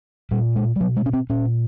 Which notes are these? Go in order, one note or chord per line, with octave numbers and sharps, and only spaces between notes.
A#2 G3
G#3
G3
B2 F#3
G#3
C#4
C4
A#2 C#4